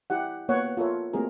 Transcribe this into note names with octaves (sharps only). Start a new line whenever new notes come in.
E4 G4 F#5
A#3 B3 C#5 F#5
F4 A4 A#4 C#5 E5
A3 A#3 C4 F#4 G#4 A#4